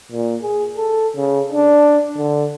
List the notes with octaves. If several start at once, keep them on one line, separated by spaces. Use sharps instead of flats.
A#2
G#4
A4
C#3
D4
D3